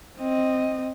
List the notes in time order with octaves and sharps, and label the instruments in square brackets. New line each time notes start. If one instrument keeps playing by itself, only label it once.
[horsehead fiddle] C4 D#5